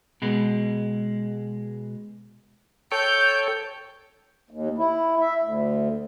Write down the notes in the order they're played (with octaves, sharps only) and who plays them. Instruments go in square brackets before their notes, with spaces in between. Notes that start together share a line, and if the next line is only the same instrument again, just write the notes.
[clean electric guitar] B2 G#3
[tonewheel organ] A4 C#5 G5 [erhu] G6
[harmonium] D#2
E4
E5
D2